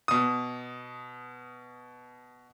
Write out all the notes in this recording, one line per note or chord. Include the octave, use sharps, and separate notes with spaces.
B2 D#6